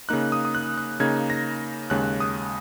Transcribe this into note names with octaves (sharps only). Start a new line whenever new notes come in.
C#3 A#3 D#4 F#6
D#6
D#6
F#6
F#6
C#3 A#3 D#4 G#6
A#6
D#2 C#3 G#3 F#6
D#6